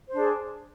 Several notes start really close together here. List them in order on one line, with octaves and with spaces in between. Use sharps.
C5 D4 G#4